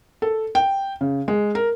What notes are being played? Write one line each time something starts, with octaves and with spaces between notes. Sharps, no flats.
A4
G5
C#3
G#3
A#4